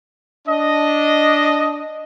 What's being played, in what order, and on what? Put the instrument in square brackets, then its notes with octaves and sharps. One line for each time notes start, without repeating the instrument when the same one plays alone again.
[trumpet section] D4 D#5